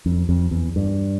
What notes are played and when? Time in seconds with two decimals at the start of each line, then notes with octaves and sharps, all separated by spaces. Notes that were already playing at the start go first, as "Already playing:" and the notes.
0.06 F2
0.29 F2
0.51 E2
0.76 G2